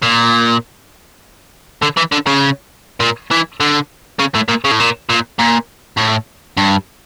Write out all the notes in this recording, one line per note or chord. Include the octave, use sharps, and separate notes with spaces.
A#2
D3
E3
D3
C#3
A#2
E3
D3
C#3
A2
A#2
C#3
A2
A#2
A#2
A#2
A2
G2